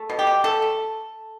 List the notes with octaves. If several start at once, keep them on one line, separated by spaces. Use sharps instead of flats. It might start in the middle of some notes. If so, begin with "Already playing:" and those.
Already playing: A3
B2
G4
B2
A3 A4
A3